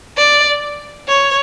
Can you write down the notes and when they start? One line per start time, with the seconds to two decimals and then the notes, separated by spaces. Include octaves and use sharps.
0.17 D5
1.08 C#5